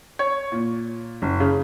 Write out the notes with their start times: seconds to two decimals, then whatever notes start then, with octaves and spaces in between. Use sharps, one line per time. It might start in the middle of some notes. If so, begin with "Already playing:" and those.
0.19 C#5
0.52 A#2
1.22 F#1
1.40 C#3